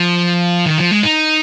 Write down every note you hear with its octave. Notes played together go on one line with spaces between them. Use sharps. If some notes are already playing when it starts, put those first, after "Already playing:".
Already playing: F3
D#3
F3
G#3
D#4